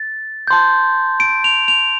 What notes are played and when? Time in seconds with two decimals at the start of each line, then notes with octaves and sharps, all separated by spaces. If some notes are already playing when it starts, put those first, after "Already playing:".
Already playing: A6
0.47 A5 C6 G6
1.20 D7
1.44 F7
1.68 F7